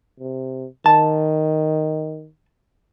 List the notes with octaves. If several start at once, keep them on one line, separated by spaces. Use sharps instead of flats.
C3
D#3 A5